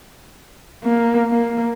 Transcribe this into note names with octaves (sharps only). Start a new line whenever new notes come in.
A#3
A#3